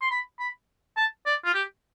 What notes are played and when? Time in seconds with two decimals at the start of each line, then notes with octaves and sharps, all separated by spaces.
0.02 C6
0.11 B5
0.39 B5
0.97 A5
1.26 D5
1.45 F4
1.54 G4